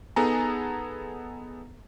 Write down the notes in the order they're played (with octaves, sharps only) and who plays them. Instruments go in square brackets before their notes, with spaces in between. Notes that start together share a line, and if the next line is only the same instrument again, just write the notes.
[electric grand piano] B3 D#4 G#4 A4 G#5 A#5